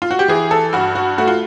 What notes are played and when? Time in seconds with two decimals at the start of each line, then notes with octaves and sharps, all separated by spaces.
0.02 F4
0.11 F#4
0.19 G4
0.28 E3 G#4
0.51 A4
0.73 G2 F#4
0.95 F#4
1.18 A3 F#4
1.27 F4